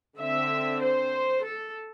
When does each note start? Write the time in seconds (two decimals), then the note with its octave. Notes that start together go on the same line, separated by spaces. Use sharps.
0.19 D3 C4 E5
0.82 C5
1.44 A4